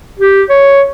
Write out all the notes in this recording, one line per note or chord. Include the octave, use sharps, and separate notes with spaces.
G4
C#5